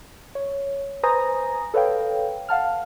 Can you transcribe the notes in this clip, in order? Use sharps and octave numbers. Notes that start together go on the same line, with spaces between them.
C#5
B4 C5 G#5 A#5 D#6 A#6
A4 B4 C#5 F5 G5
F5 F#5 A5 F6